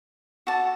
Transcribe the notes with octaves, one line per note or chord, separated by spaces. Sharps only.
F#4 A4 D5 A5